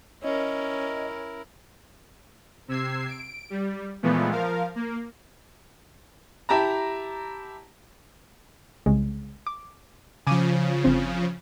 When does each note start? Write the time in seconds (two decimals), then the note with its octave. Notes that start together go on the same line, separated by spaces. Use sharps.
0.24 C#4 E4 A#4 D#5
2.68 C3 E6 G#6 C7
3.09 D7
3.50 G3
4.03 A#2 E3 F3 G#3 A3 B3
4.31 F3 A#4 F5
4.76 A#3
6.49 E4 G4 A5 A#5
8.86 C2 C#3 G#3
9.47 D6
10.27 C#3 F3 G#5 D6 D#7
10.84 G1 C4